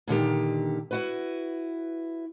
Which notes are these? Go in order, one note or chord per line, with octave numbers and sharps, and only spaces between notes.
A#2 D3 D#3 G4
E4 F#4 B4